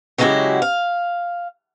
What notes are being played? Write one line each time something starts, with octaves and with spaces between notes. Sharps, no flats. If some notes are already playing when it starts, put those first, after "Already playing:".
C#3 F#3 G#3 E4 F#4 G4
F5